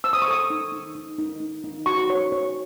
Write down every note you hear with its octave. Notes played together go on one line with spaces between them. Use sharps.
C5 E6
D#6
C#6
A4 D#6
D#4
D#4
D#4
D#4
D#4
D#4
F#4 C#6
C#5
C#5